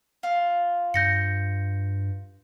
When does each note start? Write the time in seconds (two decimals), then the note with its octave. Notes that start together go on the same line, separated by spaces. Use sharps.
0.23 F4
0.94 G2 G6 A#6 C#7